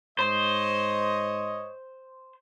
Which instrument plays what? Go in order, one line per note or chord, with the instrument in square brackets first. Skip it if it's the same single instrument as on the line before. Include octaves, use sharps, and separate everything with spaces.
[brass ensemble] G#2 C#5 D#5 [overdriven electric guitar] C5